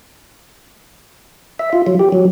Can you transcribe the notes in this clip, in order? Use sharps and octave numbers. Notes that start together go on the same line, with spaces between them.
E5
F4
F#3
G4
F#3